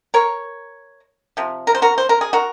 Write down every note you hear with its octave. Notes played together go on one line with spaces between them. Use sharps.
A#4 C#5
C3 F3
A#4
C5
F#4 A#4
C5
A#4
G#4
F#4 A#4